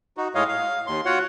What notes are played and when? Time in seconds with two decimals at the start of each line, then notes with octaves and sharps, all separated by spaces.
0.17 D#4 F#4
0.35 A2 G#3 C#5 D#5 F5
0.48 F5
0.87 D#2 C6
1.06 F4 F#4 C#5 F#5